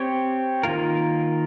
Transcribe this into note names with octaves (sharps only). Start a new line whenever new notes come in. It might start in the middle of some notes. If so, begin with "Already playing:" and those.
Already playing: C4 G4 C#5
D#3 A#3 F4 A#4